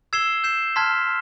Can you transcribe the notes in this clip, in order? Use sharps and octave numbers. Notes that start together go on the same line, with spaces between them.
E6 G#6 C7 E7 G7
G6 C7 E7
A5 C6 F6 G#6 B6